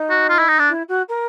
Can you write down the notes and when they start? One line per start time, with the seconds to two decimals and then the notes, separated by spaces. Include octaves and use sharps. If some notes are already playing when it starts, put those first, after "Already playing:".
Already playing: D#4
0.10 F#4
0.29 F4
0.39 E4
0.48 D#4
0.59 D4
0.69 E4
0.88 F#4
1.08 A#4